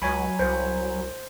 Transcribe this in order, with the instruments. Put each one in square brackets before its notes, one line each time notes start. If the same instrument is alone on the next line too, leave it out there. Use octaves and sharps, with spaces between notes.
[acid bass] C#2 [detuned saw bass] F#3 [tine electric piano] C#5 G#5 B5
[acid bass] C2 [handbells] C5